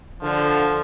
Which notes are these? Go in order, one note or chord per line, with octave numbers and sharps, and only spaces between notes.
D3 F3